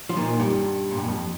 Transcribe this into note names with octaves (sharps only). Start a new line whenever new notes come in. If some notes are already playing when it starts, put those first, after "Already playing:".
F3
A#2 D#3
G2
A#2
G2
F2